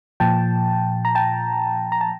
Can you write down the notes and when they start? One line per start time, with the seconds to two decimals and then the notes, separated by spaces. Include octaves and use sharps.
0.20 A#2 F3 G5 A5
1.05 A#5
1.15 G5 A5
1.92 A#5
2.01 A5